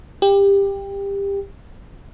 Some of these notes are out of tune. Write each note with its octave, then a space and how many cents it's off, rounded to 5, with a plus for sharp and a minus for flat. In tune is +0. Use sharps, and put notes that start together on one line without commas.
G4 +20